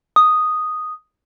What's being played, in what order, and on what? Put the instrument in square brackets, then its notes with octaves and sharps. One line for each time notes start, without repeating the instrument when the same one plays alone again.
[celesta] D#6